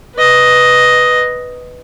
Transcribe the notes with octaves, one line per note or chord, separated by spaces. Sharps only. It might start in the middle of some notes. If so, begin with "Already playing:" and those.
B4 D#5